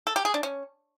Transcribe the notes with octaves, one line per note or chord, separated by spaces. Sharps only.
A4
G4
G#4
D4
C#4